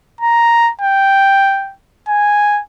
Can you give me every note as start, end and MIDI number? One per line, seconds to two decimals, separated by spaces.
0.21 0.71 82
0.81 1.73 79
2.08 2.61 80